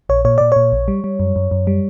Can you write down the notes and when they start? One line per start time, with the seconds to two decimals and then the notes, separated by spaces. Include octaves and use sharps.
0.09 A#1 C#5
0.25 A#2 C#5
0.38 A#2 D5
0.52 A#2 C#5
0.72 A#1
0.88 G3
1.04 G3
1.20 F#2
1.36 F#2
1.51 F#2
1.67 G3